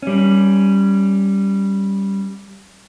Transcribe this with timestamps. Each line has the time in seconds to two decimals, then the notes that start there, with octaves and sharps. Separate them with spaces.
0.02 G3 C#4